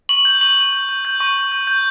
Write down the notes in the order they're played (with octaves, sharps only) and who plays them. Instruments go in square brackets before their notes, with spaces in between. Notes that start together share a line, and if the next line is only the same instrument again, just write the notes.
[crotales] C#6 F#7
G6
C#6 F#7
C#6
G6
G6
G6
C#6
G6
G6
G6